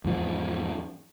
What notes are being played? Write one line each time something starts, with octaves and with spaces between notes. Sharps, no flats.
E2 G#2 F3